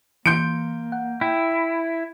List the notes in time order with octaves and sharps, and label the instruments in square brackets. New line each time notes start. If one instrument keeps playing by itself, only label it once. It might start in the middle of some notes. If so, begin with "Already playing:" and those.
[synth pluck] E3 C6 C#7 [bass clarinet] A#3 [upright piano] G6 D7
[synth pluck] F#5
[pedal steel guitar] E4 [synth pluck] G5